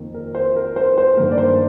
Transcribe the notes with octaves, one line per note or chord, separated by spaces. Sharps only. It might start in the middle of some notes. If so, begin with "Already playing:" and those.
Already playing: F2 D#3 A#3
A#4
C5
A#4
C5
C5
G2 D#3 A#3 A#4
D5
C5